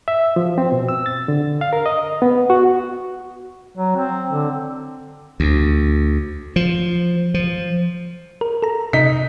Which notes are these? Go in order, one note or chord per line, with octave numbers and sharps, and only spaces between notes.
E5
F3
C4
B2
E6
A6
D3
F5
A#4
D#5
B3
F#4
F#3
C4
D3
D2
F3
F3
A#4
A4 A#5
C3 D#4 B6